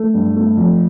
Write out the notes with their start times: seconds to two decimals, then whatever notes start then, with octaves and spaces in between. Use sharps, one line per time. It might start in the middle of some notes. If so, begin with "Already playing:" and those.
Already playing: A3
0.14 G2
0.36 A3
0.57 F2